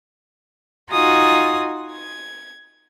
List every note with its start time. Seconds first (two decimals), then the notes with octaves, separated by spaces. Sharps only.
0.91 D#4 F4 F#4 G#5 D#6
1.92 G#6